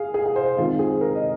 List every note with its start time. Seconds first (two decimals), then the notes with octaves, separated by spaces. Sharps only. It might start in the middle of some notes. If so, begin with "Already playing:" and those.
Already playing: G#4 F5
0.14 G#4
0.26 G#4
0.36 C5
0.57 D#3 G#3 C4 F4
0.79 G#4
1.01 A#4
1.15 D#5